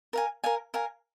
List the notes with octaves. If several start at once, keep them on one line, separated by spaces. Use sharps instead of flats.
A#4 F5 G#5
A#4 F5 G#5
A#4 F5 G#5